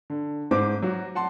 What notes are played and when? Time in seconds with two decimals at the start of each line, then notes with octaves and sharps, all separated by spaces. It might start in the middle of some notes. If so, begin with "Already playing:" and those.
0.10 D3
0.51 G#2 C5 D6
0.82 F#3 F#4
1.15 F#5 A5 C6